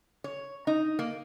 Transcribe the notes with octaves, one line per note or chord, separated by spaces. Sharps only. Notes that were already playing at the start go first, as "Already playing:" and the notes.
C#5
D#4
A#3